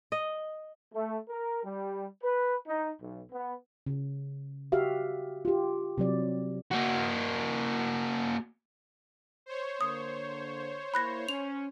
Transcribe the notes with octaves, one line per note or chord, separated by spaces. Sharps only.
D#5
A3
A#4
G3
B4
D#4
B1
B3
C#3
F#4 G4 E5 F5
F4 G4
C3 F#3 D5
A#3 F#4
C5 C#5
D3 A#3 D#6
A#3 E4 B5 F#6 A#6
C#4 F7